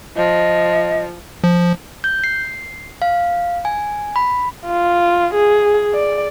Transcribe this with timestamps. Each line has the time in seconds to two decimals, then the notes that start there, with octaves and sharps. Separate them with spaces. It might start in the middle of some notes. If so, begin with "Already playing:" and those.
0.16 F3 D#5
1.44 F3
2.04 G6
2.24 C7
3.02 F5
3.65 G#5
4.16 B5
4.66 F4
5.34 G#4
5.94 D5